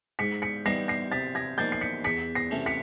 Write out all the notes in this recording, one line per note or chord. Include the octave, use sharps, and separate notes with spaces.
G#2 B6 C#7
B6 C#7
E3 G3 B3 D#4 A#6 C7
A#6 C7
C3 A6 B6
G#6 A#6
F3 A#3 D#4 G6 A6
C7
B6 C#7
E2 B6 C#7
A#6 C7
C3 E3 A3 C#4
B6 C#7